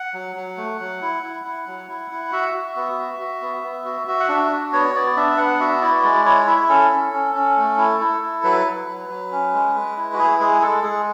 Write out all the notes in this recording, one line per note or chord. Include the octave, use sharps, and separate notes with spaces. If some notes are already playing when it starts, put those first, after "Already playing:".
Already playing: F#5
F#3
F#3
A3
F#3
E4
E4
E4
F#3
E4
E4
F#4 E5
F#4
B3
F#4
F#4
B3
B3
F#4
F#4 E5
F#5
D4 E5
F#4
B3 C#5
B3 D5
D4 E5
B3 F#5
F#4 E5
E4 D5
G#3 D5
E4 C#5
E4 E5
C#4 A4
C#4
C#4
C#4
A3
E4
E4
E4
F#3 B4
F#3
F#3
F#3
C#4
G#3
G#3
E4
F#4
E4 G#4
G#3 G#4
G#3 A4
G#3 G#4